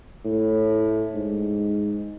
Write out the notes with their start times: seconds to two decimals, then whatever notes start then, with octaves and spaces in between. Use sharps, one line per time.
0.25 A2
1.14 G#2